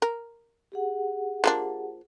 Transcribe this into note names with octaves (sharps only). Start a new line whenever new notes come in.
A#4
G4 G#4 F#5
F3 A#3 D4